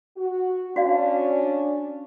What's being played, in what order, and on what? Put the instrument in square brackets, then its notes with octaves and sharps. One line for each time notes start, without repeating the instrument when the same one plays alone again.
[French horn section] F#4
[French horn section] C#4 D4 [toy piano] F#4 D5 F5